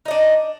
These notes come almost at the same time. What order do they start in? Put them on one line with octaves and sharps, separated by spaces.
D#4 D#5 D4